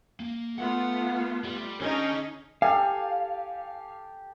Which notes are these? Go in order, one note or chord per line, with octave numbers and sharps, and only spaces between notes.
A#3
A3 B3 F4 F#5
G3
D3 C#4 D#4 G#4
G4 A4 F5 G#5